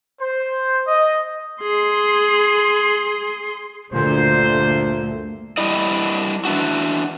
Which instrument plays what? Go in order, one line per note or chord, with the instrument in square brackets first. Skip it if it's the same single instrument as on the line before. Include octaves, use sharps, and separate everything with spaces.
[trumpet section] C5
D#5
[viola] G#4 C6
[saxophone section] D2 A#2 [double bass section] G2 D3 [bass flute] A3 [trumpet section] C5
[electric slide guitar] G3 D4 E4 D#5
E3 D4 F#4